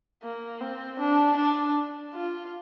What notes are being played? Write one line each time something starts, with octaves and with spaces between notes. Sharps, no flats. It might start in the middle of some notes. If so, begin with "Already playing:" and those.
A#3
C4
D4
D4
F4